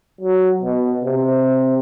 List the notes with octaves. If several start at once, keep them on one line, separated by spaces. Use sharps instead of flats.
F#3
B2
C3